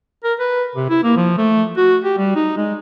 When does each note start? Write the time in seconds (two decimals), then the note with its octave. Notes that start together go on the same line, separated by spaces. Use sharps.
0.24 A#4
0.39 B4
0.75 C3
0.89 E4
1.03 A#3
1.16 F3
1.37 A3
1.77 F#4
2.04 G4
2.18 G3
2.35 D#4
2.57 G#3